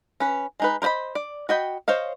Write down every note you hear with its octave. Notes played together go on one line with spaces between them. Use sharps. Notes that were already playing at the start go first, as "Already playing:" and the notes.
C#4 B4
G#3 D#4 B4
A#4 C5 D5 D#5 B5
D5
F#4 D#5 G5 B5
C5 C#5 D#5 F5